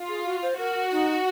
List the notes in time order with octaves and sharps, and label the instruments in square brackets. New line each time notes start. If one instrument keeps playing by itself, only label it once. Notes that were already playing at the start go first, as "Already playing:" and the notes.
Already playing: [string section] F4
[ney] G#4
F#4
C5
[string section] F#4 [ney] A#4
[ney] D#4